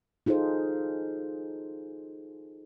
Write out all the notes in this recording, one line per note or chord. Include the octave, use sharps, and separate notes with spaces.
D#4 F4 G#4 A4 C5